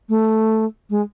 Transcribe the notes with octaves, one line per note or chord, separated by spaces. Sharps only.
A3
G#3